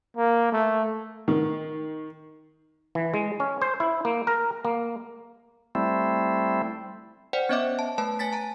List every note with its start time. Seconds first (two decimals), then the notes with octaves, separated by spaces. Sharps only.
0.17 A#3
0.52 A3
1.28 D#3
2.95 E3
3.14 G#3
3.40 C#4
3.62 C5
3.80 E4
4.05 A#3
4.27 A#4
4.65 A#3
5.75 G3 A3 C4 E4
7.33 C5 D5 F#5 G5
7.49 B3 C#4 C#5 D#5 E5 D6
7.79 A5
7.98 A3 B4 A5
8.19 C#5 G#5 A6 B6
8.33 A5 A#5